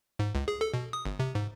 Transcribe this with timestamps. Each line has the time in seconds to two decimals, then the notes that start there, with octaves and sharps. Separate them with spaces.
0.19 G#2
0.35 C#2
0.48 G#4
0.61 A4
0.74 B2
0.93 D#6
1.06 G1
1.19 C3
1.35 G#2